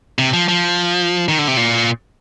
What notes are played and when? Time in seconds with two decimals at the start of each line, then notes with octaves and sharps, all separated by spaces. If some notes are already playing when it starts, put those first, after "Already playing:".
0.19 C3
0.33 F3
0.48 F3
1.28 D#3
1.39 D3
1.48 C3
1.57 A#2